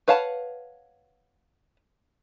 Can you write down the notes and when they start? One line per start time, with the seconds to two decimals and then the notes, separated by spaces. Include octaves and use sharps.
0.08 B4 C#5 F5 F#5 A5